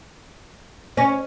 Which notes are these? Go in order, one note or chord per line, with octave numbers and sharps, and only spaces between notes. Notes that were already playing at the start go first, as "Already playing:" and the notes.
C#4